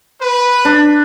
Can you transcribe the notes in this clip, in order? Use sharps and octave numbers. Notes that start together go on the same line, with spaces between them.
B4
D4